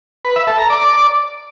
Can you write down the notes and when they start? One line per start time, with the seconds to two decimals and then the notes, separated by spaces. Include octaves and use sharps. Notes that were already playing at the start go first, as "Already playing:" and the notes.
0.25 B4
0.36 E5
0.47 A4
0.59 A#5
0.70 D5